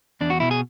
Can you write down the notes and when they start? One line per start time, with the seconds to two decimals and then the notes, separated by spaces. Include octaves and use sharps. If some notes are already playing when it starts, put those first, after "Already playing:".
0.21 E2 D4
0.30 F#4
0.40 B2 E4
0.51 G#4